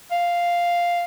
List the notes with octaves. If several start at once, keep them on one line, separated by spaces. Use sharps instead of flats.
F5